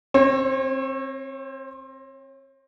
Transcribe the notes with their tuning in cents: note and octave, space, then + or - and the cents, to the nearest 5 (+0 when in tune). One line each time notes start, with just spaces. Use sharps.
C4 +20 C#5 -30